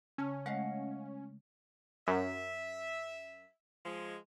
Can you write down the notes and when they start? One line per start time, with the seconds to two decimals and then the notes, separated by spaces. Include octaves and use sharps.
0.18 C#3 C#4 A5 F6
0.46 G#3 A3 D#5 F5 F#5
2.08 F#2 E5
3.86 F3 G#3